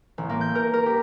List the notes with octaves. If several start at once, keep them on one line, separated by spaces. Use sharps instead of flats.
A1
A#3
G6
A#4
A#4
G4